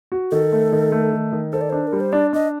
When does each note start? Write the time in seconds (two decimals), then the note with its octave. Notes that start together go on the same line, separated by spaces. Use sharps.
0.12 F#4
0.31 D#3 A4
0.52 A3
0.72 D#3
0.92 A3
1.12 D#3
1.32 D#3
1.53 A4 C5
1.61 D5
1.70 D4 C5
1.87 A#4
1.93 G3
2.00 C5
2.12 D4 D5
2.33 D4 D#5